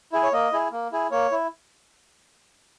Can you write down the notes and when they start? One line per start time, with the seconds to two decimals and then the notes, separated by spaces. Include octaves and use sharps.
0.13 E4 G#4
0.23 C#5
0.32 A#3 D#5
0.52 E4 G#4
0.72 A#3
0.92 E4 G#4
1.11 A#3 C#5
1.31 E4